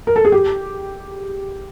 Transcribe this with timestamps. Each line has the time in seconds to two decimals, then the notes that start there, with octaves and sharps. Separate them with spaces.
0.07 A#4
0.16 A4
0.25 G#4
0.32 G4